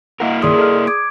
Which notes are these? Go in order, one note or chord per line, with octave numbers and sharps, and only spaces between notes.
A#3 E4 A#4 D#5 F5 F#5
C2 G2 D#3 G#4 D5 C6 D#6
A4 D#5 F6
D6 D#6 G#6 D7